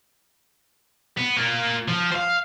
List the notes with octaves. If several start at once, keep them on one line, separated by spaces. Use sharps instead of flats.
B3
A#3 F4
F3
C5 F5